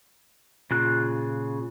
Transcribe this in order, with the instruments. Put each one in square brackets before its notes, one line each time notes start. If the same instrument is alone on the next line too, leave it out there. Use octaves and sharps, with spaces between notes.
[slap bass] A#2 [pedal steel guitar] C#3 F4 F#6